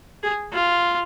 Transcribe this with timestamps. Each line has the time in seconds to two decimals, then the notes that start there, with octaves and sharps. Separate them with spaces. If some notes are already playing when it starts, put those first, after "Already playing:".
0.23 G#4
0.52 F4